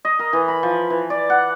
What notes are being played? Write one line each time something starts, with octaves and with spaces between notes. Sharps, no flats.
D#5
A#4
E3
B5
F3
E3
D5
F#5